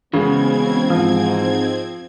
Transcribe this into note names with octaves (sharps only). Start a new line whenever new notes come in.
C#3 E3 G#3 B3 C4 G#6
G#2 F3